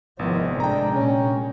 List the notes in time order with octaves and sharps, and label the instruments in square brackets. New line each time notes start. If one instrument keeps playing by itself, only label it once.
[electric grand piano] G#1 B3 [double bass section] C3 G#3 [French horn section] D#3 E4 C5 [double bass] F3
[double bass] A2 [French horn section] D4 [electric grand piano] G5 A#5
[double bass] A#2 [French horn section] C#4